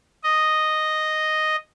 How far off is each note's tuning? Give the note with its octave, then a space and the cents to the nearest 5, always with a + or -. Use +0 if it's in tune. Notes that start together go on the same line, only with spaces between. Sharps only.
D#5 -5